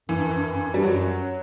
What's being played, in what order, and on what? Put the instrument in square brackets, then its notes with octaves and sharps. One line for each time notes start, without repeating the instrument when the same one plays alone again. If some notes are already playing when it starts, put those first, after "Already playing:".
[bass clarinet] F#2 [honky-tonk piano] E3
[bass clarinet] G2
F#2
G2
F#2
G2
F#2
[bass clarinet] G2 [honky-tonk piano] G3
[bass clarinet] F#2 [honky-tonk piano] F#3